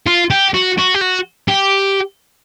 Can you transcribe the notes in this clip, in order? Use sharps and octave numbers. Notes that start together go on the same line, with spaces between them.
F4
G4
F#4
F#4
G4
F#4
G4